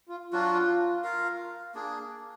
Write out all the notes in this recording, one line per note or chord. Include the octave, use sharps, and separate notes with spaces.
F4
F#3 D4 F4 F#4
F4 A#4 F5
A#3 D4 G#4